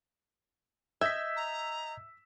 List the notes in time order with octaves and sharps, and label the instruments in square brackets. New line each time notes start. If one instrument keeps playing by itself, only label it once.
[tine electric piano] D#5 G6 G#6 [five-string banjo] E5 [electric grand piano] E6 B6
[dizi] A#5